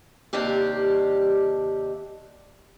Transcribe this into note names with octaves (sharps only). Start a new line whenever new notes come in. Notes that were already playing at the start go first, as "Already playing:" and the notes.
D#2 C3 D4 G4 F5